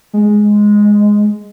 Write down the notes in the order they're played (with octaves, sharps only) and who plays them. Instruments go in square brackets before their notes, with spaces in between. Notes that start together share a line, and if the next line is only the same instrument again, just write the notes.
[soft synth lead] G#3